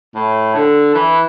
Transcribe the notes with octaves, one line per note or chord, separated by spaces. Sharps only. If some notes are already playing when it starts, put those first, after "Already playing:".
A2
D3
E3